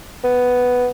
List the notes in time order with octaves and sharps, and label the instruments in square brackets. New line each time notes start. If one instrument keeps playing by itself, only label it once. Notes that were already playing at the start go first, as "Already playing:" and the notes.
[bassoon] B3